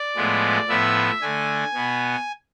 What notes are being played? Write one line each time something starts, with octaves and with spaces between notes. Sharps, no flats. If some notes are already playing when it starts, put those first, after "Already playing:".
Already playing: D5
A2 F3 G#3 B3
A2 F3 B3 E5
D3 A3 G#5
B2 B3